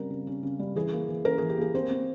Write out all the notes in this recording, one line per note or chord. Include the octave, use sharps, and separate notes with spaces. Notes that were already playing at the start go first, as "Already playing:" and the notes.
Already playing: C#3 G3 C4 A#4
C#3
C#4
C#3
G3
E3 G#4
A#3
E3
C#4 A#4
E3 G#4
G4
A#3 G#4
C4 C5
C4